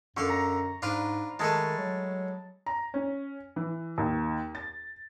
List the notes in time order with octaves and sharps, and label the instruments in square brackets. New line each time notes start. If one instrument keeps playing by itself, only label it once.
[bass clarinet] F#2 [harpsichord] D3 A4 F5 [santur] C#6
[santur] A#5
[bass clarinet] G#2 [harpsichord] D4 F4 B4
[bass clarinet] D#3 [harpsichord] G#3 A3 B4 [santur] A5
[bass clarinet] F#3
[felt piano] A#5
C#4
E3
D#2
A6